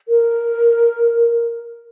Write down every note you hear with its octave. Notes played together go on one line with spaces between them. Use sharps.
A#4